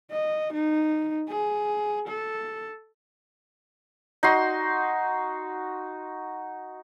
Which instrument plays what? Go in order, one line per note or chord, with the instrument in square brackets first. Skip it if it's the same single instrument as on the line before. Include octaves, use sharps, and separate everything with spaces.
[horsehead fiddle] D#5
D#4
G#4
A4
[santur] D#4 F#4 C6